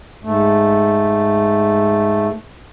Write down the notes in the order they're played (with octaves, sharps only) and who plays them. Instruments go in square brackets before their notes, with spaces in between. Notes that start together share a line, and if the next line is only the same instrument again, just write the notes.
[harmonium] G#2 A3